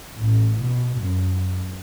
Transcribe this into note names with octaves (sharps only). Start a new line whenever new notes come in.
A1
B2
F#2